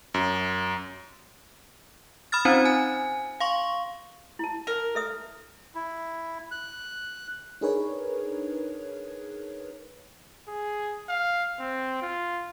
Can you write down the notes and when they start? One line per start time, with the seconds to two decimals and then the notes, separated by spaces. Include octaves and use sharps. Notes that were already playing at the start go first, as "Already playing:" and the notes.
0.14 F#2
2.32 B5 D#6 F6 A6
2.45 C4 C#4 D#4 F4 C5
2.65 G#5
3.40 F5 C6 C#6
4.39 E4 A5
4.67 A#4
4.95 A4 E5 D#6
5.75 E4
6.51 F#6
7.61 D4 D#4 G#4 A#4 B4 C#5
10.48 G#4
11.09 F5
11.60 C4
12.02 F4